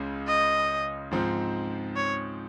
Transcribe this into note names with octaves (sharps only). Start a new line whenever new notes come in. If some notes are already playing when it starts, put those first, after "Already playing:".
Already playing: C#2 C#3 G#3
D#5
G#2 F3 C4 D#4
C#5